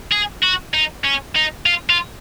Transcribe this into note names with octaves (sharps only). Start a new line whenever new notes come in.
G#4
F#4
D#4
C#4
D#4
F4
F4